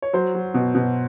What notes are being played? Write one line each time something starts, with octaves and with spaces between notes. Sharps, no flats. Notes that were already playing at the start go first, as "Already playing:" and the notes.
C#5
F#3 C5
F#3
B2
B2